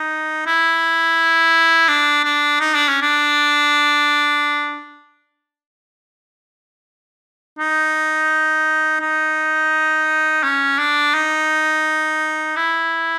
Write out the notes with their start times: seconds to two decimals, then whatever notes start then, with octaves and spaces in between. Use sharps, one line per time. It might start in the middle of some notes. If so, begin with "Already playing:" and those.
Already playing: D#4
0.47 E4
1.89 D4
2.24 D4
2.60 D#4
2.75 D4
2.89 C#4
3.02 D4
7.59 D#4
9.00 D#4
10.43 C#4
10.79 D4
11.14 D#4
12.57 E4